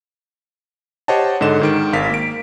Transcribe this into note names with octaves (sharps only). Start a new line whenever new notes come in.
G4 C5 C#5 D#5 F#5 A5
G#2 D3 D#5 E7
G#2 D#3 D7
G#1 F5 B6
A#3 D7